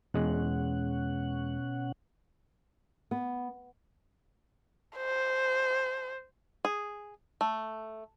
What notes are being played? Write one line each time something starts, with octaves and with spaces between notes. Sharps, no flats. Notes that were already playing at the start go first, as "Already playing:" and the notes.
E2 B2 G#3 C#4 F#5
B3
C5
G#4
A3